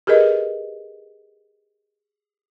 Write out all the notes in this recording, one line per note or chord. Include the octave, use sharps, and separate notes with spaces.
G4 G#4 A#4 B4 D#5